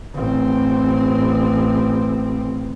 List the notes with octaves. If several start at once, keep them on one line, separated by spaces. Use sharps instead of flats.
A1 C4